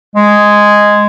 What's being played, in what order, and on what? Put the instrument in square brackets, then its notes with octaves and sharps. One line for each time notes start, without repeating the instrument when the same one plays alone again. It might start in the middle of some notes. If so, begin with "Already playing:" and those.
[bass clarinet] G#3